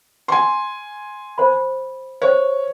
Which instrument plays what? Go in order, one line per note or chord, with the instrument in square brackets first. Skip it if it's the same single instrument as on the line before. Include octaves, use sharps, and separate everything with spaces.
[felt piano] G#5 C6
[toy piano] C5 B5
[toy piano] C5 [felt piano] C#5